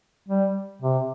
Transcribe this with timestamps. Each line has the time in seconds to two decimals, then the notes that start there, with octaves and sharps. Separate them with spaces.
0.28 G3
0.82 C3